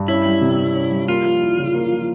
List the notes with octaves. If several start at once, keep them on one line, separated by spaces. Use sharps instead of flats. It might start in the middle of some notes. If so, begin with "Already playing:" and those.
Already playing: G2
C#4 E4
G3
C3
C3
C#4
G3
A#3 F4
F3
E4
C#3
A#3
F3